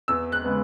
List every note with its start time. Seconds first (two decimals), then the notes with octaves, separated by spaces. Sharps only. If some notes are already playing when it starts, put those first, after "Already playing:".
0.08 E2 E6
0.32 F#6
0.44 C#3 G#3 B3